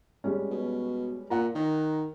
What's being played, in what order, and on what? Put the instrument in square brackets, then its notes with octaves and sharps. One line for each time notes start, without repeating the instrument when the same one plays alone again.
[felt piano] G3 G#3 C#4
[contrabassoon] B2
[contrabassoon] A#2 [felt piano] F#5 A#5
[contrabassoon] D#3